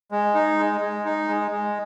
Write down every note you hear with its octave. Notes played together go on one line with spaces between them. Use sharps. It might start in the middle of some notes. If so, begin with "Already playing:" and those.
G#3
D#4
G#3
G#3
D#4
G#3
G#3